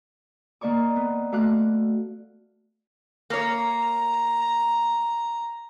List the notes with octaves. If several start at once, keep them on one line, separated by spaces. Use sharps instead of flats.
D#3 A#3 D5 C#6 D6
B3
A3 F#4 F5 D6 F#6
A#3 C#5 A#5